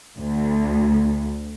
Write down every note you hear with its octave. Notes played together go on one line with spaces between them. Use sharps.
D2